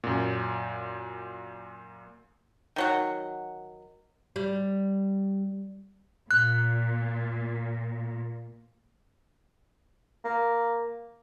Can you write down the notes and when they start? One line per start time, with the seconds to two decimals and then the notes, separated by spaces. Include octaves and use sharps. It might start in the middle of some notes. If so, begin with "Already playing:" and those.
0.04 F#2 A#2
2.76 D#3 F#3 F#5
4.36 G3
6.31 A#2 F#6
10.24 A#3